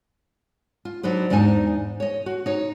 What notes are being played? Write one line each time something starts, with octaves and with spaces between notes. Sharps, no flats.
F4
F#3 D4 D#4 B4 C5
E2 G#2 D4 D#4 G#5
C#5 D#5
F#4
D#4 C#5